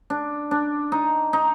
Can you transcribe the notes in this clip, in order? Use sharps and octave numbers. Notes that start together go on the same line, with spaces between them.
D4
D4
D#4
D#4